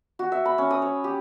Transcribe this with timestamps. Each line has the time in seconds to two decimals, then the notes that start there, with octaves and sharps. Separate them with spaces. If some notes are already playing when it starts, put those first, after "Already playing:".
0.19 F#4
0.32 E5
0.45 B5
0.58 C#4
0.70 D#6
0.82 C#5
1.04 G4